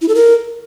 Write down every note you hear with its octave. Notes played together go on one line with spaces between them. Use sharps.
E4
A4
A#4